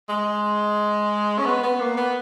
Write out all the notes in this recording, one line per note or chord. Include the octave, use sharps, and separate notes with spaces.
G#3
C#4
B3
B3
A#3
B3